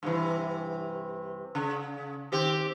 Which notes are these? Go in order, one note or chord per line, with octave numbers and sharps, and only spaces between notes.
G2 C3 E3
C#3
D#3 C4 G4